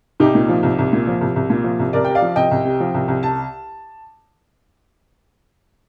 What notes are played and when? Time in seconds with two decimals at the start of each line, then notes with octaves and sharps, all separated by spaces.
0.20 C2 D#4 G4
0.35 A#2
0.49 F3
0.63 C2
0.79 C2
0.93 A#2
1.07 F3
1.21 C2
1.36 C2
1.50 A#2
1.64 F3
1.79 C2
1.93 C2 A#4 D5
2.05 C3 G5
2.15 D5 F5
2.22 F3
2.36 C2 D#5 G5
2.51 C2
2.65 C3
2.80 F3
2.94 C2
3.08 C2
3.23 A5